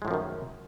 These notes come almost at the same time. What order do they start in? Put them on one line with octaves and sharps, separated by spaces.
G#3 A2 F3 F#2 D#3